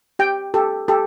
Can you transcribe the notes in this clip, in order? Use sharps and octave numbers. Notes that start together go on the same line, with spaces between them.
G4 G5
G4 A4
G4 A4